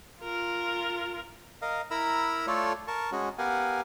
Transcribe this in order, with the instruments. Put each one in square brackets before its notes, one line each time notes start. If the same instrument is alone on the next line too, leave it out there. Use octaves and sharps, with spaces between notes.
[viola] F4 A#4
[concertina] A#4 D#5 F5
E4 A#4 A#5 B5 E6
A3 F4 A4 C#5 D5
A#4 A5 C#6
G#3 C#4 F#4
B3 G4 A#4 F5 F#5 G#5